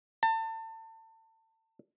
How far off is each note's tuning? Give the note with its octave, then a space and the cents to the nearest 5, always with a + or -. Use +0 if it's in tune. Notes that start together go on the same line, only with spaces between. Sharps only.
A5 +30